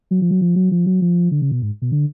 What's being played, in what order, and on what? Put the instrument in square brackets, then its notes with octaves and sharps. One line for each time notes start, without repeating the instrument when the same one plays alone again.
[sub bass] F#3
F3
F#3
F3
F#3
F3
F#3
F3
D3
C#3
B2
G#2
B2
D3